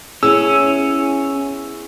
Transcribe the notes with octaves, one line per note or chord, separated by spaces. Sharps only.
B3 C#4 E4 G#4 E6